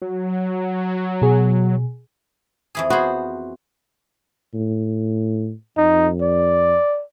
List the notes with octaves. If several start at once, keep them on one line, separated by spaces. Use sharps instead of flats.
F#3
B2 G#4
F2 E3 G#4
B3 F#4 G#4 C5
A2
F2 D#4
D5